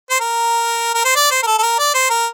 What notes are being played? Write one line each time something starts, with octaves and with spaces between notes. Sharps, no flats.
C5
A#4
A#4
C5
D5
C5
A#4
A4
A4
A#4
D5
C5
A#4